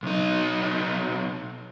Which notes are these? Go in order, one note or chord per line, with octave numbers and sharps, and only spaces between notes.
B1 D#4